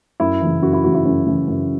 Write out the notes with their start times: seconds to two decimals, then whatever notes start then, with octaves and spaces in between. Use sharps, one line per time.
0.20 F#2 E4
0.41 C#3 E3
0.62 F#2 F#4
0.73 E4
0.84 C#3 E3 F#4
0.94 E4
1.05 F#2 C#4
1.26 C#3 E3
1.48 F#2